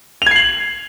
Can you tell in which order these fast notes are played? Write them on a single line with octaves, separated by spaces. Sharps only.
F7 G#6 C7 F#7